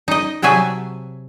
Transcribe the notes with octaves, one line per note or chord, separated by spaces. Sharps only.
D#4 D#5
C3 F#3 G#4 E5 G#5 A5